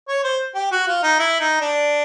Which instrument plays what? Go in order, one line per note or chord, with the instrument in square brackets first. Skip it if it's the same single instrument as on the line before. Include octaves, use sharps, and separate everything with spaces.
[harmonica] C#5
C5
G4
F#4
F4
D#4
E4
D#4
D4